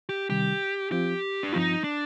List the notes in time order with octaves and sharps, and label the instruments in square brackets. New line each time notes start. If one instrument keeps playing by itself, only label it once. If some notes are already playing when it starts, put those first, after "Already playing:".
[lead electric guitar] G4
[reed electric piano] C3 D#3 G3 [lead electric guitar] G4
[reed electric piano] F3 C4 F4 [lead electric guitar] G4
[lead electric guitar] D4
[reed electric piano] G2 F3 C4 F4 [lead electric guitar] D#4
[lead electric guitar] D4